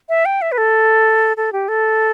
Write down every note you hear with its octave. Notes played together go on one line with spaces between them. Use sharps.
E5
G5
E5
B4
A4
A4
G4
A4